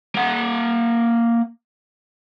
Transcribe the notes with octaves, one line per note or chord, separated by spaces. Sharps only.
A#3 F#5